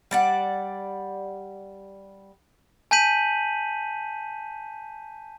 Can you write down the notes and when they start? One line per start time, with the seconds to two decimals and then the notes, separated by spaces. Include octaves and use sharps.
0.11 G3 D5 F#5
2.91 G#5 A5 G6 B6 D#7 F#7